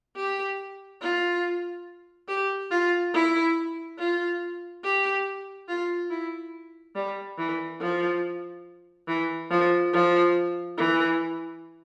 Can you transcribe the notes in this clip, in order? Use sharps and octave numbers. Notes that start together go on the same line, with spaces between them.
G4
F4
G4
F4
E4
F4
G4
F4
E4
G3
E3
F3
E3
F3
F3
E3